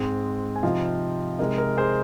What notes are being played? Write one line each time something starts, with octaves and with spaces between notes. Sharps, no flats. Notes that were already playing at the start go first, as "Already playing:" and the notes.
Already playing: G#2 G#3 C4
G#5
C3 F3 C4 D#4 C5 F5
C3 G#3 D#4 A#4 D#5
A#4
G#4 C5